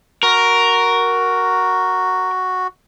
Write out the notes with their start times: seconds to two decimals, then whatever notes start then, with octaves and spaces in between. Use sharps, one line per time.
0.23 F#4 A#4